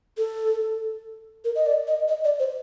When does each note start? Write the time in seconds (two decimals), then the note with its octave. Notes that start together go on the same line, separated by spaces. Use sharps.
0.18 A4
1.45 A#4
1.55 D#5
1.66 D5
1.87 D#5
2.08 D#5
2.25 D5
2.39 C5